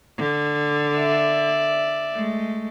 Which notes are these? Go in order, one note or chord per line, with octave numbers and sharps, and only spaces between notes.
D3
D5 E5
G#3 A3